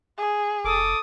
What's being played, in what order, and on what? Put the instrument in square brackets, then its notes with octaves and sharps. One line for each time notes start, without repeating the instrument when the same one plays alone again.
[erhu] G#4
[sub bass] F1 [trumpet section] A4 D6 D#6